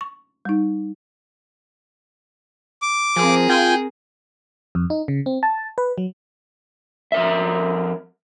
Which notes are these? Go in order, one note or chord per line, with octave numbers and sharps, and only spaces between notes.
C#6
G3 D#4
D6
F3 C4 G#4 A#4
F4 G5 G#5
F2
D#4
C#3
C4
A5
B4
F#3
F2 A#4 E5